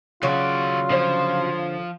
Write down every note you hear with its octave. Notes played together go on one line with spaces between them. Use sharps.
D#2 C#3 F#3 F4 D5
D3 F3 C5 C#5